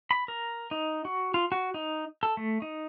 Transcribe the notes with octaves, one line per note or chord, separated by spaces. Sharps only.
B5
A#4
D#4
F#4
F4
F#4
D#4
A4
A3
D#4